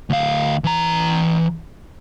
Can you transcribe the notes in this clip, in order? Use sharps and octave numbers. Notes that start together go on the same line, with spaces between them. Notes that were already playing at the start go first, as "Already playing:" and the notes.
D2 F5
E3 A#5